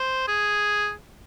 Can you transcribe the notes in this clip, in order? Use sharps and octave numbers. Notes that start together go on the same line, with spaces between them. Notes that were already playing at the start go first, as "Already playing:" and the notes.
Already playing: C5
G#4